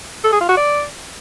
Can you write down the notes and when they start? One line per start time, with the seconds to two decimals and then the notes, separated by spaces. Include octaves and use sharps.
0.24 A4
0.32 G#4
0.41 F4
0.49 F#4
0.57 D5